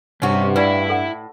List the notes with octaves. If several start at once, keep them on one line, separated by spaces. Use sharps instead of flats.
G2 C3 C#4 F#4
A2 E4 B4 D5 E5 A5
A4 F#5